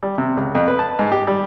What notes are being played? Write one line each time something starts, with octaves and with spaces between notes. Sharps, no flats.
G3
C3
C#2
F2
B4
A5
G#2
G4
G3